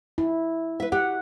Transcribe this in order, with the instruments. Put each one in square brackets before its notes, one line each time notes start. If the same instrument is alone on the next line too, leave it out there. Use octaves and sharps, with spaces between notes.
[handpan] E4
[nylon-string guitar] B4 E5
[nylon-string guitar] G4 [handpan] F#5